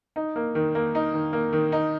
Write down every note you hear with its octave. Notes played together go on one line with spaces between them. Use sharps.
D#4
A#3
D#3
A#3
D#4
D#3
A#3
D#3
D#4